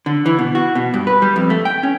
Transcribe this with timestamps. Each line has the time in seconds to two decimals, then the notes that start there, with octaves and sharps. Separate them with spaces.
0.06 D3
0.26 E3
0.39 B2
0.55 F#4
0.75 B2
0.94 G2
1.07 B4
1.22 G3
1.36 F2
1.50 A3
1.65 G5
1.83 C#4